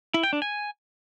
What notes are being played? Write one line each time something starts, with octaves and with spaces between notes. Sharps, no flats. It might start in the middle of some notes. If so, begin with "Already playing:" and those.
E4
G5
D4
G#5